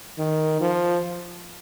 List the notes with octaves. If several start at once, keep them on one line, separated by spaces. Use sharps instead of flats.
D#3
F3